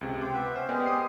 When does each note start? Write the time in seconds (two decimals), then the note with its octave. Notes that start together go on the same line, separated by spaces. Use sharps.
0.01 C#2 C3
0.21 C5 G5 D6
0.34 B3 B4 E5
0.56 C#4 C5
0.69 G#3 B3 G4 G#4 A#4 D5
0.86 D6 D#6 C7